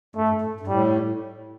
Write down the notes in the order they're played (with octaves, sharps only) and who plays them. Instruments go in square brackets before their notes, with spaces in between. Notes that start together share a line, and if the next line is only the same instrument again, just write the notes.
[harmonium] G2 [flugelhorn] A3
[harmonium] G2
A2
G2
[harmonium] A2 [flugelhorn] G3